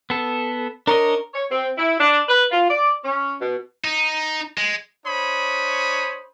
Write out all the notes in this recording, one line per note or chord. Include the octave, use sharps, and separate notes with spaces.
B3 A4
D4 A#4 C#5 D#5
C#5
C4
E4
D4
B4
F4
D5
C#4
B2
D#4
G#3
D4 C5 C#5 B5 D#6